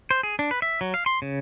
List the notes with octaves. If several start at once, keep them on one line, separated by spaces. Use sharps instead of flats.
C5
G#4
D4
B4
E5
F#3
F5
C6
C#3